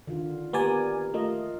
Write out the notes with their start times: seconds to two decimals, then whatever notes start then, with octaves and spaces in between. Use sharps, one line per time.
0.07 D3 D#3 F4
0.53 A#3 B3 G4 D5 G#5 A#5
1.14 A3 F4 A#4 D#5